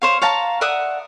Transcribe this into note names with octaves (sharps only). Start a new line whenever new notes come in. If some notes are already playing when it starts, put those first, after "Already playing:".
C5 C#5 F5
C#5 F5 A5 A#5
D5 E5 F#5 D#6